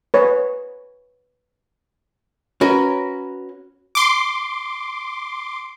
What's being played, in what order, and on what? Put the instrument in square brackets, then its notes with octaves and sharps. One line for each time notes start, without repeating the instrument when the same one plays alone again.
[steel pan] B4 C#5
[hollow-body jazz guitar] C#4 F#4 A#4 B4
[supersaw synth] C6 D6